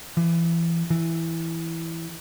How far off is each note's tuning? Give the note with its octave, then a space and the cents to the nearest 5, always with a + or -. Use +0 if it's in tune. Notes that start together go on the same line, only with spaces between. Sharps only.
E3 +25
E3 +0